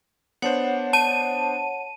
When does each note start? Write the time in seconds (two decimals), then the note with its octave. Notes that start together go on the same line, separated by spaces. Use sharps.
0.42 B3 D4 C5 C#5 F#5
0.93 A5 D#7